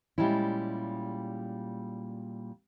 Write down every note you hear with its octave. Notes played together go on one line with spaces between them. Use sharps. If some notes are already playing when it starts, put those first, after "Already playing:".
A#2 G3 G#3 C#4 E4